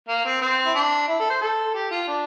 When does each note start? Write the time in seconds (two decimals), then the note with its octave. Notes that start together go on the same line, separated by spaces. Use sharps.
0.08 A#3
0.25 C4
0.41 C4
0.65 E4
0.75 D4
1.08 E4
1.20 A4
1.30 C5
1.41 A4
1.74 G4
1.91 F4
2.08 D4